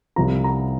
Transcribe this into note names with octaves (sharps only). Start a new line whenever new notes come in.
C2 C3 F3 A#5
A#5